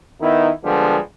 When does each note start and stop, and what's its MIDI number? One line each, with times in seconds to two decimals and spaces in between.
0.20 0.49 51
0.20 0.49 59
0.20 0.49 63
0.20 0.49 64
0.63 0.97 50
0.63 0.97 53
0.63 0.97 55
0.63 0.97 56
0.63 0.97 59